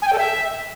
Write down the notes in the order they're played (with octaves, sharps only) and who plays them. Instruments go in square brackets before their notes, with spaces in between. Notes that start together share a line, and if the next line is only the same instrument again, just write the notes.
[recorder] G#5
G5
A4
E5